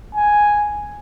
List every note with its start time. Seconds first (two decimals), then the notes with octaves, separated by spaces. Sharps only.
0.15 G#5